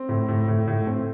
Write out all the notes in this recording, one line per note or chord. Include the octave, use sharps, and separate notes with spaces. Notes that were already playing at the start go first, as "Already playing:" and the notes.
Already playing: C4
A2
A2
A2
A2
C4